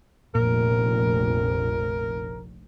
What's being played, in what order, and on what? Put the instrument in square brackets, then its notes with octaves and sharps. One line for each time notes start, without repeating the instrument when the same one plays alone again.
[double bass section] F1 A#1 [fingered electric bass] A#2 [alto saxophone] A#4